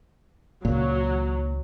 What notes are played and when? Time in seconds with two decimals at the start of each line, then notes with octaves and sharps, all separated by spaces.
0.65 C#2 A#2 D#3 F#3